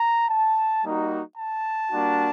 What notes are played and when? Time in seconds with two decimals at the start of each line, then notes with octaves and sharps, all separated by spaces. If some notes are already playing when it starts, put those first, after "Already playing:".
Already playing: A#5
0.29 A5
0.83 G3 A#3 D#4 F#4
1.37 A5
1.92 G3 A#3 D4 F#4